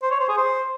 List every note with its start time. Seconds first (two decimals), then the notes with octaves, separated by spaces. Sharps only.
0.02 C5
0.11 C#5
0.20 C5
0.29 G#4
0.37 C5